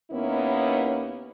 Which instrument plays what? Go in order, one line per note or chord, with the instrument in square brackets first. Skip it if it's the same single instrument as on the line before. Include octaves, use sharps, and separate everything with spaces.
[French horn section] D#2 A#3 B3 C#4 D#4 E4